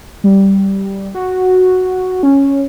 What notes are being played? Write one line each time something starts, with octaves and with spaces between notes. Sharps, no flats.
G3
F#4
C#4